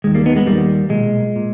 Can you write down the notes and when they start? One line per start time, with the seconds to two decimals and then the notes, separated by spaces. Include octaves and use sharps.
0.04 D#2 D#3 G#3
0.15 G3 A#3
0.26 B3 D#4
0.36 G#3 B3
0.47 D#2 D#3 G3 A#3
0.89 B1 A#2 G#3
1.36 A#2